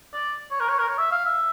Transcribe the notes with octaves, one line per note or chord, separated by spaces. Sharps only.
D5
C#5
A#4
C#5
A#4
C#5
E5
F5
E5